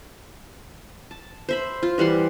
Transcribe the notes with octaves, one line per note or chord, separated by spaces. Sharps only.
A5
C5 E5 B5
F4
E3 G3 F#5 C6